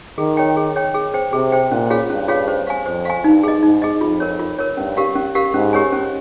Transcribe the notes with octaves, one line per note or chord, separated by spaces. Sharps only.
D#3 G#4
C#5 G5
G#4
C#5 G5
G#4
C5 G5
C3 G#4
C5 G5
A#2 C#4
F4 G#4 C#5 F5
G2 C#4
F4 G#4 C#5 F5
C5
F5 G#5
F2 C5
F5 G#5
G2 D#4
G#4 D#5
G#2 D#4
G#4 D#5
F2 F4
A#4 C#5
F4
A#4 C#5
G2 C#4
G4 A#4 F5
C#4
G4 A#4 F5
G#2 C#4
G4 A#4 C#5 G#5
C#4